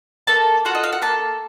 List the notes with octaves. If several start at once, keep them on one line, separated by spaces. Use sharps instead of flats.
A#3 A4 A5
F4 F#4 A4 F#5
D#5
F5
F#5
A#3 A4 A5